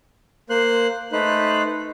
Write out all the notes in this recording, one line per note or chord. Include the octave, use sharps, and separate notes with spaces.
A#3 C5 C6 F#6
A3 D#4 B4 C5 F#6